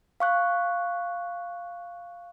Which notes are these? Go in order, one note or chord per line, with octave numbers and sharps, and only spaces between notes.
F5 C#6 F#6